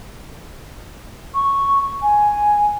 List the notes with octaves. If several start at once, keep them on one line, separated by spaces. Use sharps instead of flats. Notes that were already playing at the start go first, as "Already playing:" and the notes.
C#6
G#5